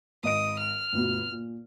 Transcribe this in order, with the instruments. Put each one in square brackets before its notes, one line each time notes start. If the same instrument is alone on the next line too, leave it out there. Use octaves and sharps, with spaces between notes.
[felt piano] G#1 D#5 D7 [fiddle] D#6
[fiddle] F6
[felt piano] G1 D2 B2
A#2